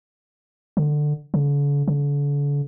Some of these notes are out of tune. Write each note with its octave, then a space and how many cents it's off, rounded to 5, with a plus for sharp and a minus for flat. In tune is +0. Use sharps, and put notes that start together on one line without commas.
D3 +15
D3 -45
D3 -40